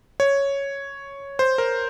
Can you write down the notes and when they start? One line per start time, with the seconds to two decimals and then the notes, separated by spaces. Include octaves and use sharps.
0.20 C#5
1.39 C5
1.58 A#4